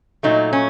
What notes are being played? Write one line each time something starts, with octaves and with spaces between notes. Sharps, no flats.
A#2 F#3 A3 D#4
C#4